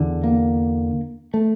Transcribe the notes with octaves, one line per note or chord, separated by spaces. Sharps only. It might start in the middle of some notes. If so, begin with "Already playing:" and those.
Already playing: E2 D3
A#3
A3